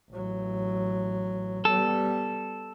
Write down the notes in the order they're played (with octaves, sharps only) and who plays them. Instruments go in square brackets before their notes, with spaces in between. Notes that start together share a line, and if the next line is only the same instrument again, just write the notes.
[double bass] A1 F#3
[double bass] G3 B3 [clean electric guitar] A4